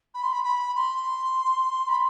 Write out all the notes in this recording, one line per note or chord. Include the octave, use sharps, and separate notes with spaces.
B5
C6
B5
B5
C6
B5